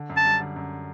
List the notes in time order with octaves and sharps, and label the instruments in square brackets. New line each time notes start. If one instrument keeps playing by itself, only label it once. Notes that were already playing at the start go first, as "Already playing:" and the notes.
Already playing: [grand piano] D3
F#2
[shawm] A5
[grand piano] G3
D3
F#2